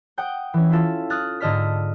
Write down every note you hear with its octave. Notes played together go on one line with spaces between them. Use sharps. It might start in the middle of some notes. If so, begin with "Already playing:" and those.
F#5 G5 D#6 G6
E3 C#4
E4 F4 A4
D#6 F6 F#6 A6
G#2 D3 A4 D#5 F6 B6